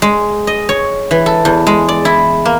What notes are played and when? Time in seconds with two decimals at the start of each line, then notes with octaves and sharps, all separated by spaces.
0.02 G#3
0.47 D#5
0.69 C#5
1.11 E3
1.26 A4
1.45 E2
1.67 G#3
1.89 D5
2.05 E4
2.45 A#3